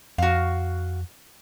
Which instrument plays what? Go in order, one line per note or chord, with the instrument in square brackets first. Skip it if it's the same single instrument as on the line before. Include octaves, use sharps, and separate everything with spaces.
[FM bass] F2 [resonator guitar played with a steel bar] F#4 F5